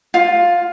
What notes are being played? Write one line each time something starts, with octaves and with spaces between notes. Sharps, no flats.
F4